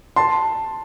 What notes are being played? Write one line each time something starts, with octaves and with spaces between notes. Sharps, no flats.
A5 C6